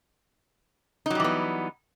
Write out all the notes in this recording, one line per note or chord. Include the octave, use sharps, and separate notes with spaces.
E3 F#3 G3 B3 D#4